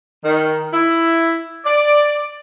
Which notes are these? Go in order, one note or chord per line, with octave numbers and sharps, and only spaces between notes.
D#3
E4
D5